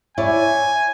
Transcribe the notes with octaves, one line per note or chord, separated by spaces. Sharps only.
E4 C#5 D5 G#5